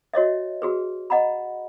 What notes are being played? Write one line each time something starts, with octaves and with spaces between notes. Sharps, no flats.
F#4 C#5 D#5 E5
F#4 G#4 B4
D#5 F#5 A#5 B5